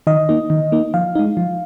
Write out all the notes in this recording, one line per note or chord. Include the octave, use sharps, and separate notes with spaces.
D#3 D#5
A#3 D#4
D#3
A#3 D#4
F3 F5
G#3 D#4
F3